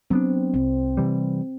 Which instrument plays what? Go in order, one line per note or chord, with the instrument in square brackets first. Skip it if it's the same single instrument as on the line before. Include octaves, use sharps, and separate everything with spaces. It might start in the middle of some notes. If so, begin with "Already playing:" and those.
[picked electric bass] F#3 B3 D4 [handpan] C4
[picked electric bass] C2 [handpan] C4
[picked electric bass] C3 E3 G3